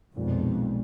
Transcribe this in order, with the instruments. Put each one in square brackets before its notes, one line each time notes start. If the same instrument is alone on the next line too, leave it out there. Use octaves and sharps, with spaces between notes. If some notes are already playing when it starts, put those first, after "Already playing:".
[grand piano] B1 A#2 G#3 B3 [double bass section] F2